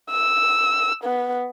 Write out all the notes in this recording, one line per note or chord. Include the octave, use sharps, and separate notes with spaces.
E6
B3